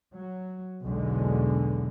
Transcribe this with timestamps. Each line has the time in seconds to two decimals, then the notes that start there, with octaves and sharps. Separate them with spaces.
0.15 F#3
0.84 B1 E2 D3 G#3